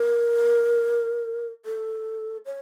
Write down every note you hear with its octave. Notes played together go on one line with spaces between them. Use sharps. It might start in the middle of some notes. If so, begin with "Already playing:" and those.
Already playing: A#4
A4
C#5